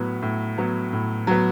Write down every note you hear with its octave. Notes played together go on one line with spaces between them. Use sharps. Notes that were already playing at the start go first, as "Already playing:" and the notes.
Already playing: A2 F#3 B3
A2
F#3 B3
A2
F#3 B3